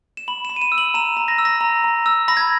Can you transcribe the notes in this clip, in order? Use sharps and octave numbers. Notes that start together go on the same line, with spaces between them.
E7
B5 F#7
B5 E7
D#7
E7
E6
F#7
A#5 E7
A#5
A#6
E6
A#6
A#5
A#5
E6
B5 A#6
G#6